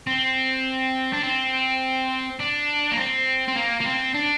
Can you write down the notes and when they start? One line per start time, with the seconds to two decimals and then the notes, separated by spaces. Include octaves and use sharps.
0.07 C4
1.13 D4
1.24 C4
2.39 D4
2.92 A#3
2.97 C4
3.48 C4
3.56 A#3
3.81 A#3
3.85 C4
4.14 D4